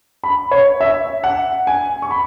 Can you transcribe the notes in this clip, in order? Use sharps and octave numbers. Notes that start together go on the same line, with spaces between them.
B5
C#5
E5
F#5
G#5
C#6
B5